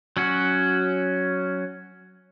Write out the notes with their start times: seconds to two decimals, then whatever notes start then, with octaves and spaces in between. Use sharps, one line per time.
0.17 F#3 C#4 F#4